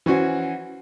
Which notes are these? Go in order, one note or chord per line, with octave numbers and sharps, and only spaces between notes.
E3 C#4 F#4 C5